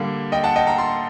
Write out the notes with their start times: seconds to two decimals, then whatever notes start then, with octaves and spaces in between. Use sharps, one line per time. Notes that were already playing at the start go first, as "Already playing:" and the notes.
Already playing: D3 G3 A#3
0.32 D#5 G5
0.44 F#5 A5
0.56 D#5 G5
0.67 G5 A#5
0.78 A5 C6